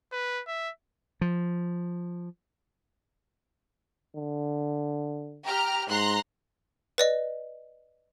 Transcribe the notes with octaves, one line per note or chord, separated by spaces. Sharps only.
B4
E5
F3
D3
G4 A#5 F6
G#2 A#5 C6 F#6
B4 D5 D#5